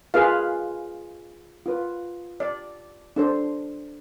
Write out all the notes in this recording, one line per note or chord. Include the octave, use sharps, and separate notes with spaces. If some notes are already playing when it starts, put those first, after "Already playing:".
F4 G#4 B4 F5
F4 B4
D5
D4 A4 C5